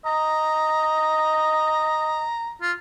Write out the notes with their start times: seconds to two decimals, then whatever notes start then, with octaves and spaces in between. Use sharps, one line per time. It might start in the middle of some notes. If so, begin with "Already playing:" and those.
0.06 D#5 A#5
2.61 F4